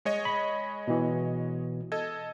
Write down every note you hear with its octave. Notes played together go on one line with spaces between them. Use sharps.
G#3 C#5 D#5
B5
B2 E3
A4 D#5 G#6